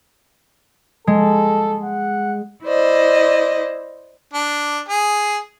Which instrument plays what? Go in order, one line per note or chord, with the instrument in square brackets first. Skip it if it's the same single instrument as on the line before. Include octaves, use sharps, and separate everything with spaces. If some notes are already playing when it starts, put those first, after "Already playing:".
[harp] G#3 [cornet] A4
[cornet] F#5
[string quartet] E4 C5 D5 D#5
[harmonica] D4
G#4